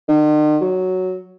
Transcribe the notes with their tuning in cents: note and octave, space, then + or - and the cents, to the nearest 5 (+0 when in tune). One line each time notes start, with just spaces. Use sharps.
D#3 -45
F#3 +0